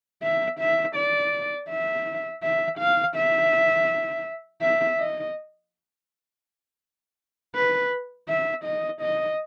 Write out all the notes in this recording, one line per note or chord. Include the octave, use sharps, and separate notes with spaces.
E5
E5
D5
E5
E5
F5
E5
E5
D#5
B4
E5
D#5
D#5